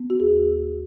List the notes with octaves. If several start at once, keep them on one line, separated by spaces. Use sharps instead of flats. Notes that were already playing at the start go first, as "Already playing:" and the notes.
Already playing: B3
F#4
D#2 G#4